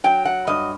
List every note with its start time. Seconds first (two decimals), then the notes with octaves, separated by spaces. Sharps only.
0.04 F#3 G5
0.25 F#5
0.47 G2 D#5